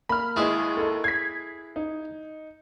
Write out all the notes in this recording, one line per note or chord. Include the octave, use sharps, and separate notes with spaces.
A#3 B5 F6
D#2 G#3 E4 G#4 B4
A4 A#4 D#5
G#6 B6 C7
D#4